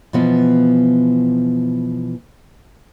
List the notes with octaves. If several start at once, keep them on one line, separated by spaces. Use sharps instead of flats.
B2 E3 F3 B3